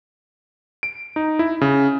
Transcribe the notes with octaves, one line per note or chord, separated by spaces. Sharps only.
D7
D#4
E4
C#3